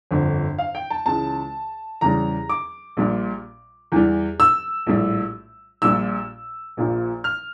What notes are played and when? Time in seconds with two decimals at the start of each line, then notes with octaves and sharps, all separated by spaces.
0.11 G1 F2 D3
0.59 F5
0.75 G5
0.90 A5
1.06 C#2 C#3 E3 A5
2.01 E2 C#3 G3 A#5
2.50 D6
2.97 A#1 A#2 G3
3.92 E2 E3 G3
4.40 E6
4.87 A#1 A2 G3
5.82 A#1 A#2 G3 E6
6.77 A#1 A#2 F3
7.24 F6